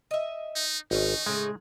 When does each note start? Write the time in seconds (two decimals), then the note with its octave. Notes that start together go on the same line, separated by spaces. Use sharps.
0.11 D#5 E5
0.56 D#4
0.91 G#1 D#3 C#4 D#4 F5
1.26 A2 C#3 G#3 G#4